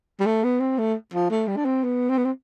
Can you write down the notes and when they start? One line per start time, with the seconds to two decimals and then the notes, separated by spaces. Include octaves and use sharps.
0.20 G3
0.26 A3
0.44 B3
0.60 C4
0.78 A3
1.14 F3
1.30 A3
1.48 G3
1.57 D4
1.65 C4
1.83 B3
2.09 C4
2.18 B3
2.25 C4